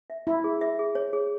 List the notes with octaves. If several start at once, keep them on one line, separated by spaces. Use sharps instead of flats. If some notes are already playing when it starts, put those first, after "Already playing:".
E5
E4 E5
G#4
E5
G#4
C#5
G#4